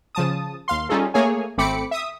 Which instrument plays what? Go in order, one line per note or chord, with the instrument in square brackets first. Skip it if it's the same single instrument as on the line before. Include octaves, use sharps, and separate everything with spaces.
[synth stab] C#3 F3 A5 D#6
D#2 F5 C6
G3 C#4 D#4 F4 G#4 A4
A3 A#3 G#4 C#5 G#5
G#1 A3 C4 B5 D6 C#7
E5 D#6